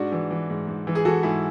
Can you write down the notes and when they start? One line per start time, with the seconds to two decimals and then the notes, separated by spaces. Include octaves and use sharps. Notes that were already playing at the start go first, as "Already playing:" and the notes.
Already playing: G#2 D4 F#4
0.12 E3
0.31 E3
0.50 G#2
0.67 G#2
0.87 E3
0.95 G#4
1.05 E3 F#4 A4
1.23 G#2 E4 G#4